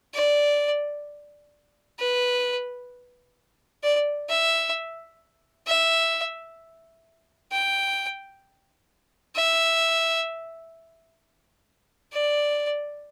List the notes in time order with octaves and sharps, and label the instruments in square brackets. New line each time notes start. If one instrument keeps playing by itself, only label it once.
[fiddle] D5
B4
D5
E5
E5
G5
E5
D5